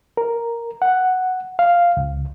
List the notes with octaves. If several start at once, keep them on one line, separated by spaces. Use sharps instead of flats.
A#4
F#5
F5
C#2